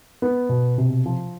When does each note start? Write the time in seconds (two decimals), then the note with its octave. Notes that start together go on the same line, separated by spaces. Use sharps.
0.22 B3
0.49 B2
0.78 C3
1.06 F3